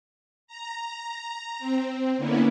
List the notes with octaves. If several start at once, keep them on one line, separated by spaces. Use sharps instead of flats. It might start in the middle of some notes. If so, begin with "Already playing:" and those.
A#5
C4
D3 A#3 B3 C#4 E4